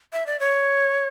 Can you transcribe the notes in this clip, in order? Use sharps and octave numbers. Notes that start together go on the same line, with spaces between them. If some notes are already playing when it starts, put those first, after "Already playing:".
E5
D5
C#5